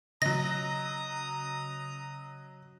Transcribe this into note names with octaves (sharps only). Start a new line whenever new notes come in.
C#3 F#3 D#5 A#5 D#6 A#6